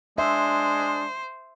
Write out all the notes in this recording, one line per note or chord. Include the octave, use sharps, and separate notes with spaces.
G#3 D4 C5 E5